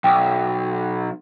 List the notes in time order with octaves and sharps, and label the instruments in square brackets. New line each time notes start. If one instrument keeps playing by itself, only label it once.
[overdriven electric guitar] B1 [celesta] G5